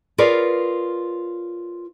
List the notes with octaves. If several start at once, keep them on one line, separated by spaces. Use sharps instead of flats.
F4 G#4 A#4 B4 C#5 D5